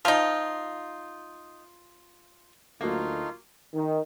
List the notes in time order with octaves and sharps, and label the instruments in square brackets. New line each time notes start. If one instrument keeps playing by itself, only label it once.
[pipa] F3 D#4 [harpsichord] F4
[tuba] D2 [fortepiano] F#3 A#3 [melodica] A3 D#4 [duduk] F4
[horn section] D#3